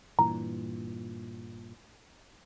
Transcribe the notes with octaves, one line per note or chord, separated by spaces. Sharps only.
G2 A#2 E3 A#5